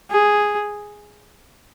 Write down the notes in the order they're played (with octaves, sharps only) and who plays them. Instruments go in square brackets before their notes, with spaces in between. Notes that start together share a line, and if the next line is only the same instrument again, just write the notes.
[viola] G#4